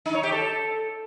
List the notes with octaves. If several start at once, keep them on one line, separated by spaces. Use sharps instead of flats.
D#4
C#5
G4
A4